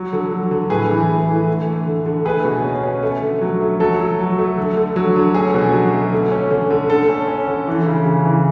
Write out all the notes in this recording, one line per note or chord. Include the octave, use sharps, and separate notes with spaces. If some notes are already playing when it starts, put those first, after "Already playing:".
Already playing: F#3
D3
F#3
D3
A2 G#4 B4
E3
A3
E3
D3
A3
D3
D3
A3 G#4 B4
B2
C#4
C#4
A3
D3
F#3
A3
F#3 A4
F#3
F#3
A3
D3
D3
F#3
D3
C#4 G#4
B2
F#3
A3
D3
C#4
D3
D3
D3 A4
C#4
C#4
D3
E3
C#3
C#3
E3